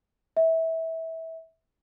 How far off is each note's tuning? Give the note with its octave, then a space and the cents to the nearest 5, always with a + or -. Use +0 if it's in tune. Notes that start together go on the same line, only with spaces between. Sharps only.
E5 -20